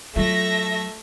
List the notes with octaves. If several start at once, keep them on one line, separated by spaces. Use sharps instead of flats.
F#3 A3 F4 E5 A#6